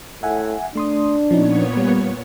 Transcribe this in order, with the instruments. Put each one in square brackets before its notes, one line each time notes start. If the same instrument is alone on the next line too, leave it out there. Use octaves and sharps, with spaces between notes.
[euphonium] A2 [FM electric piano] E5 F#5 G#5
[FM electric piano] A3 C6 D#6 [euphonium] D4
[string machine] A#2 B3 C#5 [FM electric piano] F3 C#4 D#4
[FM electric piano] G3